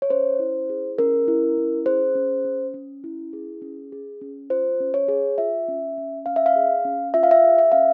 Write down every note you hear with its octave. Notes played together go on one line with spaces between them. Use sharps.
C#5
C#4 C5
E4
G#4
C#4 A#4
E4
C#4
G#4 C5
C#4
C#4
C#4
E4
G#4
C#4
G#4
C#4
F4 C5
C#4
C#5
G#4
F4 E5
C#4
C#4
C#4 F5
E5
F5
G#4
C#4
F4 E5
F5
E5
G#4
E5
C#4 F5